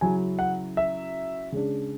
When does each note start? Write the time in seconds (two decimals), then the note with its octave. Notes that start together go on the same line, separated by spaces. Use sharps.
0.01 C#3 F#3 C#4 E4 G#5
0.39 F#5
0.77 E5
1.52 C#3 G#3 D4